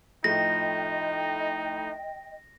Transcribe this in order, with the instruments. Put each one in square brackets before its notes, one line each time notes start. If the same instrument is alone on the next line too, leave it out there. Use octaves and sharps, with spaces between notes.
[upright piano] A2 F3 A3 [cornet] D#4 [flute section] D#5 G5 [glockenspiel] A#6